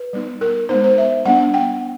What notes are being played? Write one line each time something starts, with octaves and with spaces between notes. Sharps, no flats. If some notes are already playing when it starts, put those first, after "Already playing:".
Already playing: B4
G3 B3 D#4
A#4
G#3 B3 D#4 C5
C5
E5
G3 B3 D4 F#5
G5